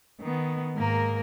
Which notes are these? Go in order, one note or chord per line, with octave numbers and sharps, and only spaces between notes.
D#3 B3
G#2 G#3 A#3 A#4